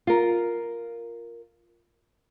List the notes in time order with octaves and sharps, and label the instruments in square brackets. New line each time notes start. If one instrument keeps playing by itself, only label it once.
[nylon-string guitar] F4 A#4